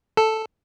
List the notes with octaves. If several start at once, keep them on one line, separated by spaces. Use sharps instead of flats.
A4